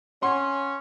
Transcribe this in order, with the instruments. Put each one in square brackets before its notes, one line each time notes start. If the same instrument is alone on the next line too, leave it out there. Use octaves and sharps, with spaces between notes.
[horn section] C#4 [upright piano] F#5 C6